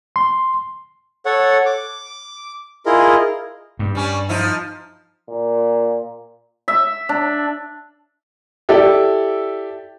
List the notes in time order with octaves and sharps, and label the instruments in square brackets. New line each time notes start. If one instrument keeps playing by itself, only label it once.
[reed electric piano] C6
[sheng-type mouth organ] A4 C#5 F#5
D6
E4 F4 G#4 A#4 D#5
[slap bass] G2
[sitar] G3 C#4
F3 D#4 E4
[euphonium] A#2
[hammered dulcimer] E5
D4
[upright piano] E4 G4 A4 D5